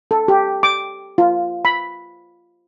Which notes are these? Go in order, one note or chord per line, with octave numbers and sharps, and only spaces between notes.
A4
G4
D6
F4
B5